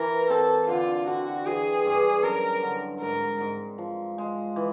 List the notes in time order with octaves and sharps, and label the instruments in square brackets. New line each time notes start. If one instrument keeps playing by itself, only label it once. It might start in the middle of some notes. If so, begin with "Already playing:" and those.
Already playing: [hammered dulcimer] E3 [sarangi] A#4
[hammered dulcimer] C4 [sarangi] A4
[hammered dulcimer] D3 [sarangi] F4
[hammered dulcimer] D3 [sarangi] F#4
[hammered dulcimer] E3 [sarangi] G#4
[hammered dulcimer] G2
[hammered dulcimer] F#2 [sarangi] A#4
[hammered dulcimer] D3
[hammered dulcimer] G#2 [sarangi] A#4
[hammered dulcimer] G#2
F3
G#3
E3